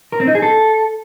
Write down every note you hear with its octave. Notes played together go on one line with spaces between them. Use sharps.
A#4
C4
D#4
G#4
A4